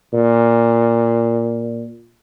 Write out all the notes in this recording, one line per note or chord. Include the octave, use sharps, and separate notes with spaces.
A#2